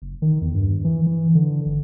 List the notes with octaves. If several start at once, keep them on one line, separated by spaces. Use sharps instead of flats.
F#1
D#3
E2
G2
E3
E3
D3
G#1